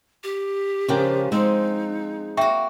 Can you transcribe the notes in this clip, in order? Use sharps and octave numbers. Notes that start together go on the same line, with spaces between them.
G4
C#3 F3 G#3 D4 A#4 G5
G#3 C4 D#4
A#3 F#4 E5 G5 C#6